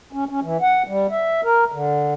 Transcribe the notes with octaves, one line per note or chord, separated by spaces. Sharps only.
C#4
C#4
E3
F#5
G3
E5
A#4
D3